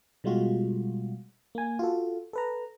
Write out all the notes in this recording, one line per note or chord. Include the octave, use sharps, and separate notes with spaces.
B2 G3 G#3 F4 F#4
A#3 G#5
F4 F#4 A4
A4 B4 A#5